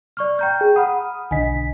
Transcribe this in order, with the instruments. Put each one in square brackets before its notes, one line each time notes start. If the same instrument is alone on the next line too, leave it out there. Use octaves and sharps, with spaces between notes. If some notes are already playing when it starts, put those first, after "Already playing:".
[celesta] D5 C#6 F6
G5 A#5 G6
[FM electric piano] G#4
[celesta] F#5 B5 F6 [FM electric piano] D#6
[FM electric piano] B1 D3 B6 [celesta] D#5 G#5